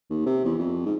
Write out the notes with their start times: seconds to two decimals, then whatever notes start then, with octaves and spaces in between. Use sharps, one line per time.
0.10 D#2
0.26 C3
0.45 E2
0.58 F2
0.86 G#2